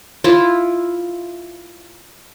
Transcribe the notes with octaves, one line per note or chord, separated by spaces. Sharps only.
E4 F4